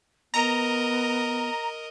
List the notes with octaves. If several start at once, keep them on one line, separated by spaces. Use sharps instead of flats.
B3 A#4 D#5 A#5